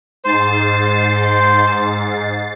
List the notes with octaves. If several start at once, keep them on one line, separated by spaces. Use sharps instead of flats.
G#2 C5 A6 C7